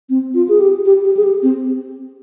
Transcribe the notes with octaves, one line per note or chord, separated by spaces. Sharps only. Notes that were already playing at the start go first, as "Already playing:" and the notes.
C4
F4
G#4
G4
G4
G4
G#4
G4
C4